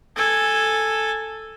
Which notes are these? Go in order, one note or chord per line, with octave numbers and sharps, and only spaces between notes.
A4 G#5